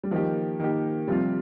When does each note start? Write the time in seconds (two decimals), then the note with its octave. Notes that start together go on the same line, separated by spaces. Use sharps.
0.04 G3
0.11 D#3 F3 A#3 G4
0.60 D#3 A#3 G4
1.08 C3 F3 G3 C4 F4